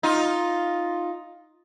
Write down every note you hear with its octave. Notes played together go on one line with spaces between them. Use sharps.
D#4 F4